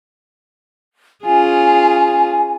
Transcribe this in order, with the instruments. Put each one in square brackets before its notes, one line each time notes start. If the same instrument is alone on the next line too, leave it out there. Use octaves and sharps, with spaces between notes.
[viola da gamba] C#4 F4 G#4 [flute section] G#5